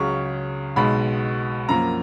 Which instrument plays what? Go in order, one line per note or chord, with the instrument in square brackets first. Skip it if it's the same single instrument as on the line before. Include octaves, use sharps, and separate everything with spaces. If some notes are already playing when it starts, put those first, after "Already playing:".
Already playing: [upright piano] C#2 C#3 F#3 C#6
B1 B2 G#3 B5
F#2 F3 A#3 A#5